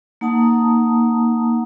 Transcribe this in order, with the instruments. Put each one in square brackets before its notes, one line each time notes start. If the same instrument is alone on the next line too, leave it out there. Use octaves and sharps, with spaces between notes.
[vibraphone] A#3 D#4 F#5 A5 A#5 D#6